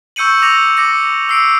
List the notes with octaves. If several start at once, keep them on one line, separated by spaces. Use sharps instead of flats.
C#6 E6 G6 C#7 D#7 F#7
D6 E6 A#6 C#7 F7
D6 A#6 C#7
E6 C7 D7